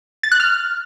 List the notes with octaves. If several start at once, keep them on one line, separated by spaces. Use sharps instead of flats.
A6
F#6
F6